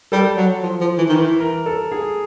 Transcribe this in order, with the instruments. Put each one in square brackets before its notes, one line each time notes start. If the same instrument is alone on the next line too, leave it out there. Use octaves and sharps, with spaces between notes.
[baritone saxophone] G3 [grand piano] A4
[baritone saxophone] F#3
F3
F3
E3
D#3
E3
[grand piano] A#4
A4
G#4